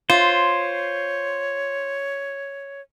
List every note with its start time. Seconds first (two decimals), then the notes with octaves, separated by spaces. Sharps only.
0.10 F4 C5 C#5